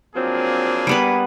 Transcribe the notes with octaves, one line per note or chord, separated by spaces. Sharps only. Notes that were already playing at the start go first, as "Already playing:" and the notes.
F3 F#3 A#3 C4 D4 G#4
G3 B3 B4